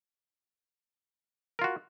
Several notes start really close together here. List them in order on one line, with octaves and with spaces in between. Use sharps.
A#4 F4 F#4